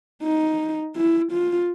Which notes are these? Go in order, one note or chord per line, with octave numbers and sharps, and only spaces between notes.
D#4
E4
F4